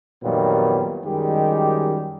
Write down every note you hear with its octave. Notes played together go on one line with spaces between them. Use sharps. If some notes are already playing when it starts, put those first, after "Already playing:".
F2 A#2 D#3 F#3 G3 B3
F#2 D#3 G3 G#3 G4